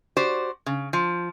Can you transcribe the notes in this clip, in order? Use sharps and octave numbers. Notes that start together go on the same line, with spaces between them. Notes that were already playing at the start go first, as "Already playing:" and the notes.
F#4 G4 C5 D5
C#3
F3